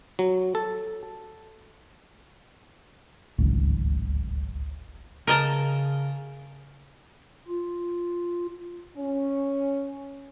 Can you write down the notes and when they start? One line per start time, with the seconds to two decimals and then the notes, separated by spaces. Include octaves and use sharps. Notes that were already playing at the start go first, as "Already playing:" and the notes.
0.19 F#3
0.55 A4
3.38 D1 G#1 C#2
5.27 C#3 A#4 D#5 A5
7.48 F4
8.97 C#4